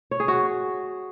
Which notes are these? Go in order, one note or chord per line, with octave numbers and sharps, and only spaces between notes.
C#5
G#4
F#4